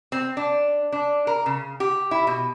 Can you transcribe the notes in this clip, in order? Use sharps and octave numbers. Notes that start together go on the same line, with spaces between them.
C4
D4
D4
A#4
C#3
G4
E4
B2